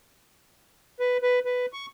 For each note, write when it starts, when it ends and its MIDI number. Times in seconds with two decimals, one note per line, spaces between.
1.00 1.17 71
1.22 1.39 71
1.45 1.66 71
1.73 1.86 85